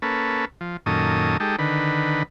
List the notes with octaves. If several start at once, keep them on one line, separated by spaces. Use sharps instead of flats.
A#3 C#4 A4 B4
F3
F#2 A#2 D#3 C#4 A4 D#6
G#3 D#4 G4 A4
D3 D#3 B4